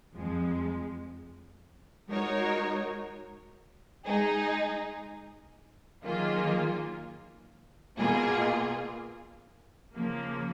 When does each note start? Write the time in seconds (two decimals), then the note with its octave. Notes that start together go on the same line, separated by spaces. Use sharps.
0.13 F2 F3 G#3
2.10 G#3 D#4 F#4 A#4 C#5
4.06 G#3 D#4 G#4
6.03 D#3 F#3 A#3 F4 G#4
7.99 B2 A#3 F4 G#4
9.95 C#3 F3 A#3